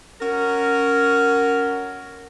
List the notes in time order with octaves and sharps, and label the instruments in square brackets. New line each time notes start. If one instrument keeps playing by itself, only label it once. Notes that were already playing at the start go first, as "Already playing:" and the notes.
[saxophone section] C#4 F#4 A#4